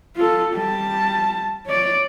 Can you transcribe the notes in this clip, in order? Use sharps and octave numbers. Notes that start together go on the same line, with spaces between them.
F4 A4
G3 A5
C#5 D5